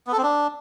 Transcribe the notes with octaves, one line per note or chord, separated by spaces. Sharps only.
B3
A4
C4
D4